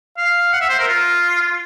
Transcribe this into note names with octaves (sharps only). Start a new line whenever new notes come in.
F5
F#5
E5
C5
A#4
F4